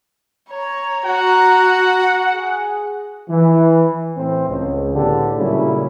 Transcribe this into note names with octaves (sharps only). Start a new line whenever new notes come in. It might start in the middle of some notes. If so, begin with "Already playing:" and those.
C#5 A#5
F#4 F#5
G#4
E3
A2 E3 C4
C#2
A2 D3 B3 G4
A#2 C#3 F#3 G3 E4